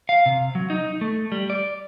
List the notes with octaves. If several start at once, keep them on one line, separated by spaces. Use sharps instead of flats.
F5
C3
F#3
D#4
A3
G3
D5